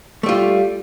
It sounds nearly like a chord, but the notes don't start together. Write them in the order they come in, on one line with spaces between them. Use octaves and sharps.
A3 G3 F4